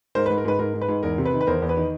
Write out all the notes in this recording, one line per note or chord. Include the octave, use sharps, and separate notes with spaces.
G#2 A#4 C5
B4
G#2
A#4
G#2 B4
G#2 A#4
G#2
B4
G#2
E2 A#4
C3
B4
D#3
B4
E2 A#4 C5
E2
B4
D#3